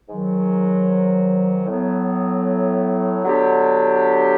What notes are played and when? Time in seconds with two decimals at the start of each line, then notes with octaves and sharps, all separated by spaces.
0.08 G#2 D#3 F#3
1.66 A2 F#3 B3
3.23 D3 F#3 B3 D4 G4